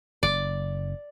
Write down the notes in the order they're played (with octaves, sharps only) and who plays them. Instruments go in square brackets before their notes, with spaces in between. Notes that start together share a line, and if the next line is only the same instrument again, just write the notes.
[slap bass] F#1 [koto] D5